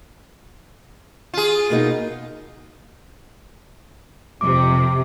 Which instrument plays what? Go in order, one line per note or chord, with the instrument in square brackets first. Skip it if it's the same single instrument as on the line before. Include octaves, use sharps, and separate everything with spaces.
[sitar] F4 G#4
[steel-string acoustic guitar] B2 A#3 D#4
[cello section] F2 C3 [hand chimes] D6